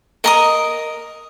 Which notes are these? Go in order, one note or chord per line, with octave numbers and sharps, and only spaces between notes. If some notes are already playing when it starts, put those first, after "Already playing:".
A#4 D#5 A#5 D#6